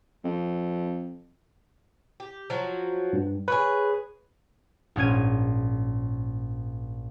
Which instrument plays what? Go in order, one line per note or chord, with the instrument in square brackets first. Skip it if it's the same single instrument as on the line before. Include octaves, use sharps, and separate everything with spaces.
[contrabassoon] F2
[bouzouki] G4
F3 F#3 F#4
[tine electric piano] G2
[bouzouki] G#4 C#5 [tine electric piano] B4
[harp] A#1 G#2 C#4 G#6 D#7